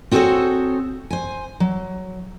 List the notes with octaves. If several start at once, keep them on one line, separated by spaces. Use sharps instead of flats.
C4 F#4 G#4 A4 C5 C#5
C5 G#5
F#3